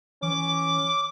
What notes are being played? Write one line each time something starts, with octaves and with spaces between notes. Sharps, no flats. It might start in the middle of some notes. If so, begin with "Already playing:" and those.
E3 C#4 D6